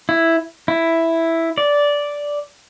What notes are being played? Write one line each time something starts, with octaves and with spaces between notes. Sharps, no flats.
E4
E4
D5